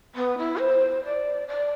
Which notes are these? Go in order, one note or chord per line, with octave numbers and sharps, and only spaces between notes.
B3
E4
C5
D5
D5